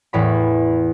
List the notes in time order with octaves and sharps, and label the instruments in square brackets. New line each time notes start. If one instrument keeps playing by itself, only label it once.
[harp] E2 A2 B5